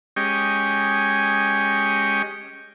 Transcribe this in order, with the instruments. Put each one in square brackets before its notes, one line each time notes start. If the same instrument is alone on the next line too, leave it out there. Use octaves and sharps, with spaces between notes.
[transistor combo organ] G#3 C#4 G4 D#5 G5 C#6